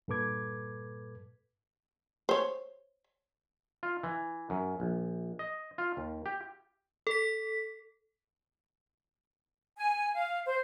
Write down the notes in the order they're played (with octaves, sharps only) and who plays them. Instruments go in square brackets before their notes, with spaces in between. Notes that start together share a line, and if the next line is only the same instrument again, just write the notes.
[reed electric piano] G2 A#2 A4 B4 D6 G#6
[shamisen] C5 C#5
[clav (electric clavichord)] F4
E3
F#2
A#1
D#5
F4
D#2
G4
[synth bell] A4 B6
[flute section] G#5
F5
C5